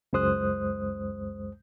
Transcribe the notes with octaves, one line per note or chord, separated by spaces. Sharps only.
C#2 F#2 G#3 C5 D#6 F#6